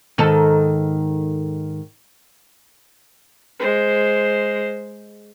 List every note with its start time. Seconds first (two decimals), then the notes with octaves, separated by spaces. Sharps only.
0.18 G#2 D#3 A4
3.59 G#3 C5